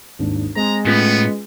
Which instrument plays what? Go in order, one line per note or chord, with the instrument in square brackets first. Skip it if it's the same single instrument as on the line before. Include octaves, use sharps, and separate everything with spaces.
[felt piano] G#1 D#2 D4
[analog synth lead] G#3 [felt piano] C4 [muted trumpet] A#5
[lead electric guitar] A2 [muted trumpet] B3 [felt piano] C#4 F4 B4